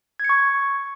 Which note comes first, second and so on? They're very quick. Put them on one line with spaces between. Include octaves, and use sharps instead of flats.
G#6 C#7 C#6